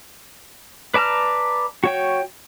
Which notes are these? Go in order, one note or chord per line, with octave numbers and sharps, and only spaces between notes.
B4 D5 A5 A#5 F6
F#4 C#5 G5